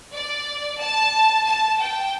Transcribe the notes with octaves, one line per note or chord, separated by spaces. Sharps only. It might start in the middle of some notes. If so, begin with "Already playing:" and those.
D5
A5
A5
G5